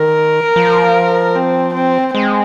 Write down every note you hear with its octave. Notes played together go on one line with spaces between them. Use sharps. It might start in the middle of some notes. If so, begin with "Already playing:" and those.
Already playing: D#3 A#4
F3
C4
C4
G#3 C4